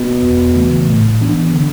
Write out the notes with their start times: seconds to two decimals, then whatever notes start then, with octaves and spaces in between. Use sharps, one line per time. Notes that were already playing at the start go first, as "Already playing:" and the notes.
Already playing: B2
0.22 E2
0.55 C#3 E3 A3
0.87 A2
1.20 E3 B3 D4
1.53 D3